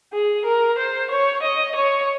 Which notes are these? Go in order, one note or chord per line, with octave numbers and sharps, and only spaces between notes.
G#4
A#4
C5
C#5
D#5
C#5